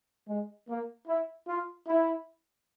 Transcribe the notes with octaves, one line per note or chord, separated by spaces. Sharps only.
G#3
A#3
E4
F4
E4